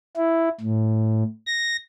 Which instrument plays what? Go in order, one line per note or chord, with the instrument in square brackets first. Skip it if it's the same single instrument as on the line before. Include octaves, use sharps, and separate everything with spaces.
[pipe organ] E4
A2
A#6